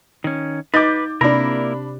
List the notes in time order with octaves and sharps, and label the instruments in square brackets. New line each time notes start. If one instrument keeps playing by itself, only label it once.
[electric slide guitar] D#3 C#4
[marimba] D#4 D#5 [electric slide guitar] B4 [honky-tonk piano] D6 G6 A6
[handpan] C3 [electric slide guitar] A#3 E4 A#4 [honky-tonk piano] D4 B5